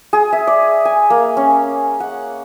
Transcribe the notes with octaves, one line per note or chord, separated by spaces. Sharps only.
G#4
E5
D5
G#5
A#3
C#4
F#5